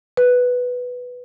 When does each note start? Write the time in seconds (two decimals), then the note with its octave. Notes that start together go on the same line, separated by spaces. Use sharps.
0.17 B4